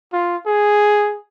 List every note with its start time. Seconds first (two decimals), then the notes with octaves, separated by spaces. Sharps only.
0.13 F4
0.46 G#4